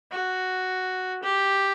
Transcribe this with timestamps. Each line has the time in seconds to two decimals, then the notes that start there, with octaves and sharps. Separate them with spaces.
0.12 F#4
1.23 G4